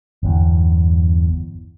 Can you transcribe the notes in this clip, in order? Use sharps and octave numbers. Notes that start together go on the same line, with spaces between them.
G1 E2